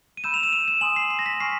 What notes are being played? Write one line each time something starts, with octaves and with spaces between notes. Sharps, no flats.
D#7
B5 E6 G6 E7
F7
E7
D#7
E7
G#5 C6 D#6 F#7
C7
C7
A#6
B6
G#5 C#6 F6 C7